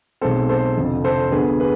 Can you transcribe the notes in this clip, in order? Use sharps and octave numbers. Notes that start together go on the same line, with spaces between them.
B1 B2 G#3 C4 A4 C5
A4 C5
F1 F2 D3 F3
A4 C5
D2 D3 F3 B3 G#4 B4
G#4 B4